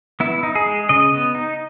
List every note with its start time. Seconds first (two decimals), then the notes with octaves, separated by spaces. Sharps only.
0.20 B3 E4
0.43 D#4
0.55 G#4
0.66 G#3
0.89 C#3 D#5
1.12 B3
1.35 D#4